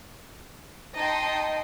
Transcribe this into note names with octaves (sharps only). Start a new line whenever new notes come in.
D#4 D#5 G5 A5 C6